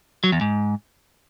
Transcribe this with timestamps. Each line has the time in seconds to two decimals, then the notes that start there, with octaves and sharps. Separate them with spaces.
0.24 F#3
0.32 E2
0.41 G#2